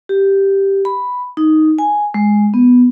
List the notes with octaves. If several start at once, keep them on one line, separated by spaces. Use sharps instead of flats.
G4
B5
D#4
G#5
G#3
B3